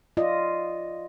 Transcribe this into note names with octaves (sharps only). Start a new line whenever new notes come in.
F4 D5 D#5